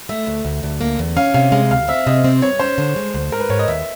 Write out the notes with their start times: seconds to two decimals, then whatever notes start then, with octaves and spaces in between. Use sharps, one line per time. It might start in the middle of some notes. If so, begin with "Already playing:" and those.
0.09 A3 E5
0.27 D2
0.45 D2
0.63 D2
0.81 A#3
0.99 E2
1.16 C#4 F5
1.34 C3 F5
1.52 G#3 F5
1.71 D2 F5
1.88 C4 E5
2.07 C3 D#5
2.24 C4
2.42 G2 C#5
2.59 C#4 C5
2.78 D3
2.96 G#3
3.14 D2
3.32 G#2 A#4
3.40 B4
3.49 G#2 C#5
3.59 D#5
3.68 D#2 E5